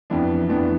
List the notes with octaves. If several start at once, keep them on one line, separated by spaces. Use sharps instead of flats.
F2 E3 B3 D4
F2 E3 B3 D4